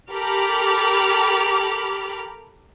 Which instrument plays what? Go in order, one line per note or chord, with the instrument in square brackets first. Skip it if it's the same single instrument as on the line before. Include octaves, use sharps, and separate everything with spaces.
[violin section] G4 A4 A#4 B5 D6 F6